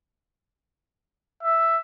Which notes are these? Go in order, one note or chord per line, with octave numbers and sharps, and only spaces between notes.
E5